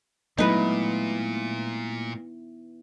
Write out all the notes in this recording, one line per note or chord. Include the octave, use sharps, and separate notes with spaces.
A#2 F#3 G#3 A3 B3 D#4 E4 B4